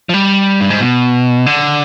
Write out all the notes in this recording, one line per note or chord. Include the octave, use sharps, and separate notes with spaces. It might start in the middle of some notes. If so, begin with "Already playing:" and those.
F3
G3
G2
G#2
B2
D3